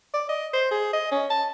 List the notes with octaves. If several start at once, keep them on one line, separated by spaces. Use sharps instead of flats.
D5
D#5
C5
G#4
D#5
C#4
A5